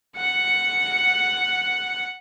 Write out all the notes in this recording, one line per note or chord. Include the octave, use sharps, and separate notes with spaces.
F#5 C#7